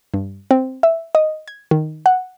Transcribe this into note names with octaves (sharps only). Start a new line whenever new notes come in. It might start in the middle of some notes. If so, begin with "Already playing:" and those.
G2
C4
E5
D#5
G#6
D#3
F#5